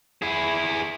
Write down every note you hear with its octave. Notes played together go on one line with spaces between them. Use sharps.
E4 G#4